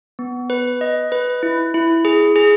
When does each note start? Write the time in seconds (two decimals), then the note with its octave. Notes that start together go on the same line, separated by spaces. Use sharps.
0.19 B3
0.50 B4
0.81 D#5
1.12 B4
1.43 E4
1.74 E4
2.05 G#4
2.36 G#4